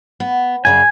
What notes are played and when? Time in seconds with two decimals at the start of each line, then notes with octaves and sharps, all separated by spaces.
0.20 B3
0.65 F#2 C#3 D5 G#5